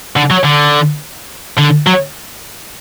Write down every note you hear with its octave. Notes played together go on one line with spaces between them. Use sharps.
D3
F#3
D3
D3
F#3